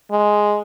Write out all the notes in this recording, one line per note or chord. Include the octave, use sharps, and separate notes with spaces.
G#3